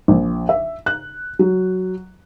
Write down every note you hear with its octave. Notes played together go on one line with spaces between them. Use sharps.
A#1
E5
F#6
F#3